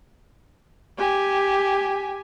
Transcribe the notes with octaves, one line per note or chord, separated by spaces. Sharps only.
G4 G#5